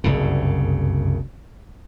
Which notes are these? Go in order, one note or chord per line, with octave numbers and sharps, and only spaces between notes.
F#1 C2 G2 C#3